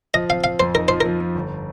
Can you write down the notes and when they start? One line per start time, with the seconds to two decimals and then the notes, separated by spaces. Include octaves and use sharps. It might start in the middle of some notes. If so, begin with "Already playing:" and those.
0.14 F3 D#5
0.29 C4 F5
0.44 C4 F5
0.60 F2 C5
0.74 D#4 A#4
0.88 F3 C5
1.01 F3 A#4
1.20 F3
1.35 G1